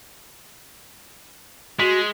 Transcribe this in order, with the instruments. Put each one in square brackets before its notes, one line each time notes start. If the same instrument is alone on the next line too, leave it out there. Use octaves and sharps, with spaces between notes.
[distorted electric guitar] G#3 [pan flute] F#4 [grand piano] B6